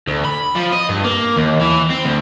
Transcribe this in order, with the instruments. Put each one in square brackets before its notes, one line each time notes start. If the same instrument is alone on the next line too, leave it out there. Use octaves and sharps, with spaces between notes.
[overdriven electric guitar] D2
B5
F3
D#5
G2
A#3
D#2
E3
C4
D2